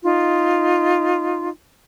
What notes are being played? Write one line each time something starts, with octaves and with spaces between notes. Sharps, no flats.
D#4 F4